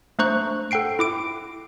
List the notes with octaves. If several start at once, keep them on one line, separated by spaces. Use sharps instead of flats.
A3 D4 C5 A#5 C#6 F#6
A4 F#5 G5 C7 D7
E4 D6 D7